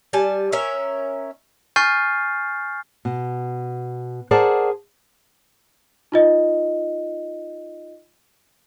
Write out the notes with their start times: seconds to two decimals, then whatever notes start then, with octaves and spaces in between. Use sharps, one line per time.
0.13 G3 G#5 A5
0.52 C#4 A#4 E5
1.76 G#5 C#6 F6 G6 A6 C7
3.05 B2
4.31 G#4 A#4 C5 D5 F#5 A5
6.12 D#4 F4 D#5